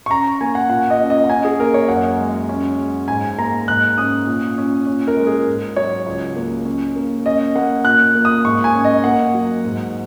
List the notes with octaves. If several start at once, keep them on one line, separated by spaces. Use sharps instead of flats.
C#6
C#4 A#5
A#3 G#5
F#5
A#2 F#5
D#5
C#4
D#5
F#5
C#4 G#5
G#4
A#3 A#4
C#5
F#2 F#5
G#3
C#4
G#3
G#2 G#5
A#3 A#5
G#2 F#6
C#4 D#6
A#2
C#4
C#4
A#4
G#3
G#4
G#2
F#3 C#5
C#2
A#3
C#4
A#3
C#4 D#5
A#3 F#5
A#2 F#6
A#3
D#6
G#2 C#6
G#5
C#4
D#5
A#3 F#5
F#3
G#2